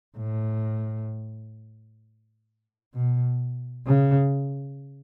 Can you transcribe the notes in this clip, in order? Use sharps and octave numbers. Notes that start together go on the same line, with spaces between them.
A2
B2
C#3